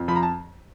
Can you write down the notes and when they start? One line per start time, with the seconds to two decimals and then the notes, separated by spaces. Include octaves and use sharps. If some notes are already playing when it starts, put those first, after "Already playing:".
Already playing: F2
0.08 F3 B5
0.16 A#5
0.23 A5